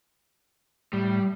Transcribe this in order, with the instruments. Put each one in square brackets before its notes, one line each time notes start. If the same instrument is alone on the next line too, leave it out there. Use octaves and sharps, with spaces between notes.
[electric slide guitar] A2 [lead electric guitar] G3